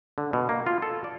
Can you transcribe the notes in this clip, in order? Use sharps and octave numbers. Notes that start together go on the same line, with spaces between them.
D3
B2
A#3
F4
A4
D5